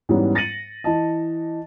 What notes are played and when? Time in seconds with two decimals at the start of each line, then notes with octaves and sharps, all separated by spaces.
0.09 G#2 E3 G3 B3 C#4
0.35 A6 A#6 C#7 D#7 F#7
0.84 E3 D#5 A5